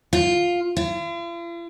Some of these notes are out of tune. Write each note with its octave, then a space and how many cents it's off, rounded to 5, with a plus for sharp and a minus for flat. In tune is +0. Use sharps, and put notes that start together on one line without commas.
F4 +5
F4 -45